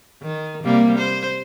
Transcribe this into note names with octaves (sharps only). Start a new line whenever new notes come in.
D#3
C3 G3 A#3
C5